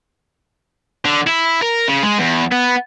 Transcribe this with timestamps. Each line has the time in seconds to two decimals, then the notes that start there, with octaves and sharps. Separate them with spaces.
1.05 D3
1.27 E4
1.63 A#4
1.88 C#3
2.03 G#3
2.19 E2
2.52 B3